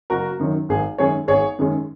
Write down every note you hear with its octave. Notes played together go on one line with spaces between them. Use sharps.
F#1 F#4 A#4
F#2 D#3 F#3
G#1 G#4
F#2 D#3 G#3 C#4 G#4 C#5
G#1 G#4 C#5
F#2 D#3 G#3 C#4